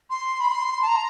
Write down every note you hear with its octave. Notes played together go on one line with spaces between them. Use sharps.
C6
B5
C6
A5
A#5